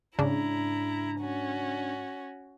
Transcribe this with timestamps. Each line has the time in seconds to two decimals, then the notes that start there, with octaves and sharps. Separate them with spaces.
0.19 G#2 C#3 D4 E4 A#5
1.20 C#4 F#4